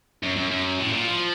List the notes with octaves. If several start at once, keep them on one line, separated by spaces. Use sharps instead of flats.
F#2
F#2
F#2
A2
A#2
F3